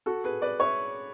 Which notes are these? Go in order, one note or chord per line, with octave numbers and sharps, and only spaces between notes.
F#4 A4
G#4 B4
B4 D5
C#5 E5